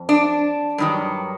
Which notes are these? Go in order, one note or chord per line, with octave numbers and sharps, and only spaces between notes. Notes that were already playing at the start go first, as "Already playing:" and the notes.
Already playing: F2
D4
G2 D#3 F#3